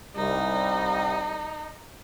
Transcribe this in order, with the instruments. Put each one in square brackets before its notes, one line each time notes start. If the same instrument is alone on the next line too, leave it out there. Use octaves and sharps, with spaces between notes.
[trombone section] C2 G3 [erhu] D#4